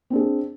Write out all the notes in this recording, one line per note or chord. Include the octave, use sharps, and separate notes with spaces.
C4 D4 G#4